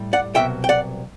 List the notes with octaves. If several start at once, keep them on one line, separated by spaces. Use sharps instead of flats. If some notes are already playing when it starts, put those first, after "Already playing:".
Already playing: A2 G3
D5 F#5
C2 B2 F#3 E5 G5
G5
D5 F#5